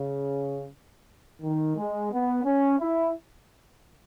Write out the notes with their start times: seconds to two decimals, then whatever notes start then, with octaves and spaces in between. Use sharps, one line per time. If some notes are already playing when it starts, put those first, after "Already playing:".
Already playing: C#3
1.42 D#3
1.77 G#3
2.11 B3
2.45 C#4
2.79 E4